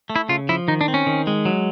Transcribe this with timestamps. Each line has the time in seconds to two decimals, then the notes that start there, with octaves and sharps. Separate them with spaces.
0.10 A3
0.16 E4
0.29 C#3 F4
0.49 F3 E4
0.68 D#3 D#4
0.81 D4
0.88 C4
0.94 C#4
1.07 D#3
1.27 G#3
1.45 F#3